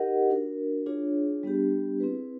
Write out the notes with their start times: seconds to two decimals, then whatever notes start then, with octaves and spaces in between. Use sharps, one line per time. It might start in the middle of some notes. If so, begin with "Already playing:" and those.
Already playing: D#4 G4 A#4 D#5 F#5
0.29 D4 F#4 A#4
0.86 D4 F4 G#4 C#5
1.43 G3 B3 D4 G4
2.00 C4 E4 G#4 B4